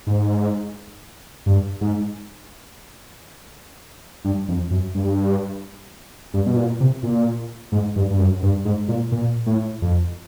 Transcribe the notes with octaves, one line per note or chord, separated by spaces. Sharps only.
G#2
G2
G#2
G2
F2
F#2
G2
G2
B2
A#2
C3
A#2
G#2
G2
G2
F#2
G2
G#2
A#2
A#2
A2
F2